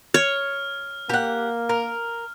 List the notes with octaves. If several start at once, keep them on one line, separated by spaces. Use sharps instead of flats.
C#5 F6
A#3 G4 F#5
A#4